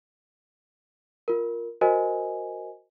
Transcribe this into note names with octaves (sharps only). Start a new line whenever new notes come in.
F4 A#4
F#4 A#4 C5 D#5 G#5